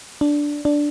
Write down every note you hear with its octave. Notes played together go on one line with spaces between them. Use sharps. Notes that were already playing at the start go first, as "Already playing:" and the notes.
D4
D4